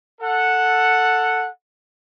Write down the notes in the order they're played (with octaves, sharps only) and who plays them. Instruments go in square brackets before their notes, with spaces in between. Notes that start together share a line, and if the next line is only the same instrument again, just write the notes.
[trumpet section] A4 F#5